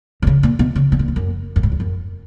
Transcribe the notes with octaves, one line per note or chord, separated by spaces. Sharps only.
D#3
C#3
A#2
B2
C#3
B2
A#2
G#2
F#2
F#2
G#2
F2
F#2